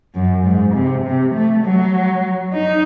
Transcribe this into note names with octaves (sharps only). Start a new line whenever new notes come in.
F#2
G#2
C3
C3
A3
F#3
D#4